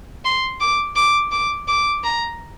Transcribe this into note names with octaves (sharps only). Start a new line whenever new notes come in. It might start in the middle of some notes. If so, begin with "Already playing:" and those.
C6
D6
D6
D6
D6
A#5